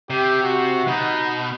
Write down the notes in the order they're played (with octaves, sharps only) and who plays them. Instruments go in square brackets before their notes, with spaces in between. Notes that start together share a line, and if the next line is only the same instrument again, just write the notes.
[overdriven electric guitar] C3 [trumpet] G4
[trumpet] F#4
[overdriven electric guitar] B2 [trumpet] D#4